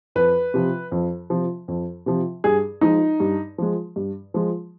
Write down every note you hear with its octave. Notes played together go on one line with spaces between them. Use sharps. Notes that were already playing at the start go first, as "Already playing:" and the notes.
F2 B4
C3 F3
F2
C3 F3
F2
C3 F3
G2 G#4
F3 G#3 D#4
G2
F3 G#3
G2
F3 G#3